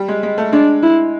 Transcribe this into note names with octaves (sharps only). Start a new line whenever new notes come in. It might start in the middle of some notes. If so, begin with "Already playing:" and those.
Already playing: G3
G#3
G#3
A3
G#3 D4
E4